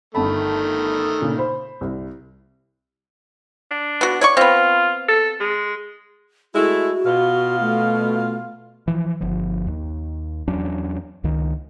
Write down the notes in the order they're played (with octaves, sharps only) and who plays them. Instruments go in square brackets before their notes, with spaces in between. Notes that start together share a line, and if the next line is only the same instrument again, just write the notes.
[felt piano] G1 A5 B5 [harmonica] D#3 A3
[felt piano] A#2 C#3
C5 B5
C2
[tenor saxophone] D4
[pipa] B3 F#4
C#5 D5 C#6
[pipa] B3 C4 [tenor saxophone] F4
[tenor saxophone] A4
G#3
[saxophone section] G#3 A3 E4 [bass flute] F#4
[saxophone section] B2 F4
[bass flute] A3
[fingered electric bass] E3 F3
G1 F3
D#2
E2 F#3 C#4 D4
C#2 D#3